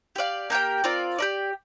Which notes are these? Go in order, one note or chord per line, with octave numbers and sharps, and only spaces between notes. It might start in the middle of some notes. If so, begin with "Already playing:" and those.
G4 D5 F5
A#3 G4 A#4 G5
C4 F4 A#4 D5
G4 A#4 D5